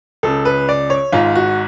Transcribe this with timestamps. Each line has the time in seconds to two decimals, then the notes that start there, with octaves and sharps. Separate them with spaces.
0.23 C#2 C#3 A4
0.45 B4
0.69 D5
0.90 C#5
1.12 G#1 G#2 F4
1.35 F#4